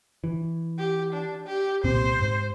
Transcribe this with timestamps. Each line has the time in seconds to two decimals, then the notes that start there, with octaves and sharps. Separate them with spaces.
0.24 E3
0.78 G4
1.13 D4
1.46 G4
1.84 C2 A#2 C4 C5
2.21 G#2